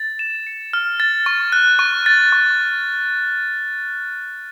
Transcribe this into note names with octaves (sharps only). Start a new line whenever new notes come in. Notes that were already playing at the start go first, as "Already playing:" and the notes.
Already playing: A6
E7
C#7
F6
A6
C#6
F#6
C#6
A6
C#6